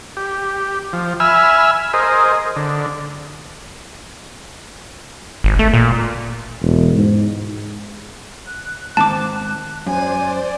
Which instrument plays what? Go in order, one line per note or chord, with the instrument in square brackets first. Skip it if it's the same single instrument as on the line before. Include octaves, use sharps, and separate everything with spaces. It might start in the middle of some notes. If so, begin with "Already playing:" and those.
[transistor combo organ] G4
F3
E5 G#5 B5 E6 F6
G#4 A#4 C5 D#5
D3
[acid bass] G#1
A3
A#2
[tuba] E1
G#2
[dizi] F#6
[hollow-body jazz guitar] G#2 D#3 C4 [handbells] A5 D6
[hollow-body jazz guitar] F#2 [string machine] C5 D5 [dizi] G#5